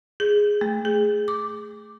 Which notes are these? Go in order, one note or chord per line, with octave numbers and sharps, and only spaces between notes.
G#4
A3
G#4
D6